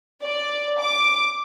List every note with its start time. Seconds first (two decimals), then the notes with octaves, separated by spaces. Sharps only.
0.22 D5
0.79 D6